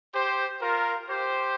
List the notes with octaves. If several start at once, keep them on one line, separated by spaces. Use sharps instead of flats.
G4 C5
F4 A#4
G4 C5